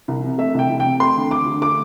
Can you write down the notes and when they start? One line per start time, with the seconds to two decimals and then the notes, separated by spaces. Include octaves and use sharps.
0.08 C2
0.23 C3
0.38 A3 E5
0.54 C2 G5
0.69 C2
0.80 C3 G5
1.00 A3 C6
1.16 D2
1.31 D2 D6
1.46 D3
1.62 A3 D6